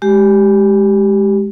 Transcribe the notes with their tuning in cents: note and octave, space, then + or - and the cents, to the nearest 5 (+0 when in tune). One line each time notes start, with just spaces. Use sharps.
G#3 +0 G4 -10